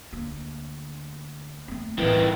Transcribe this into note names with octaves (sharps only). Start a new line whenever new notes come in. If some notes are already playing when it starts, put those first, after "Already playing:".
D2 A#3
A3 C4
F2 A2 D#3 E3 G3